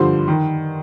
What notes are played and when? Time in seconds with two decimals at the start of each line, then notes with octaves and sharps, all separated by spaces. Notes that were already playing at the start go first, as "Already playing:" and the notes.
Already playing: G2 D3 F3 C5 C6
0.28 D#3